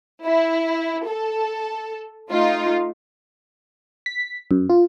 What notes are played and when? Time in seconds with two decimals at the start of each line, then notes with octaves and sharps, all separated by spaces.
0.23 E4
1.07 A4
2.31 A3 D#4 F4
4.06 B6
4.51 F#2
4.70 F4